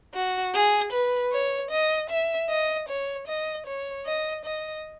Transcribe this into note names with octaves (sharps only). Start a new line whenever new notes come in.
F#4
G#4
B4
C#5
D#5
E5
D#5
C#5
D#5
C#5
D#5
D#5